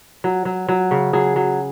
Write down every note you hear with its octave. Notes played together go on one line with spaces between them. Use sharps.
F#3
F#3
F#3
C#3
F#3 G#4
F#3